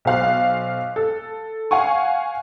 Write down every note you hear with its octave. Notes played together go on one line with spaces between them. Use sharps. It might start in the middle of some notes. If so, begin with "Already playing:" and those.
B1 C5 F5 F#6
A4
F5 F#5 G#5 C#6